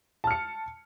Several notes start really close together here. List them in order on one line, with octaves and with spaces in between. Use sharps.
A5 F6 C#7